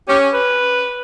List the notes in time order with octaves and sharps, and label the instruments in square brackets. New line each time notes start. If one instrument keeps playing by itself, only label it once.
[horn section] C#4 [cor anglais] G4
[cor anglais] B4